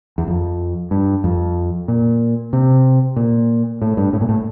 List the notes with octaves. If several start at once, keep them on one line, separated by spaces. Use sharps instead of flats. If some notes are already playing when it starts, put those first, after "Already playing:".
E2
F2
G2
F2
A#2
C3
A#2
A2
G2
A2
A#2
A2